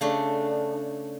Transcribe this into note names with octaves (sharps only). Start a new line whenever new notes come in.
C#3 A3 D4